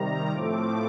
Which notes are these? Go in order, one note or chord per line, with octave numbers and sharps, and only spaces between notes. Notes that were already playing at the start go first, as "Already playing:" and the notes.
Already playing: C3 D#3 G3 A#5
A2 F3 A3 C4 D6